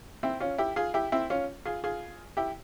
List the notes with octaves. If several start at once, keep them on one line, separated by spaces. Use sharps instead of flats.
C4 E4
C#4 F4
E4 G4
F4 G#4
E4 G4
C4 E4
C#4 F4
F4 G#4
F4 G#4
E4 G4